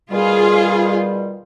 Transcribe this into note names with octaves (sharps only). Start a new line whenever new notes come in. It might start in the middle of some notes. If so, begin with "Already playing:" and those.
B2 D#3 G3 F4 G#4